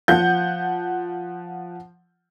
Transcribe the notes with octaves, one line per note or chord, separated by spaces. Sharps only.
F3 F#5 G6